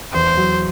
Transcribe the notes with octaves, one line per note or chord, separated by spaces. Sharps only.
E2 C5
F#3